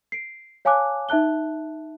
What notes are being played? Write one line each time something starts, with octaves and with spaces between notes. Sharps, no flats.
C7 D7
C#5 F5 G#5 A5 D6 F#6
D#4 E5 A5 F#6 G7